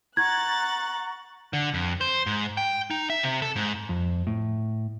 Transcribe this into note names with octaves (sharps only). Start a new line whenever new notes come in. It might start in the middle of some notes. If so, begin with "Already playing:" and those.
F#5 A#5 C#6 F#6 G#6 A6
D3
F2
C5
G#2
G5
D#4
E5
C3
A4
G#2
F2
A2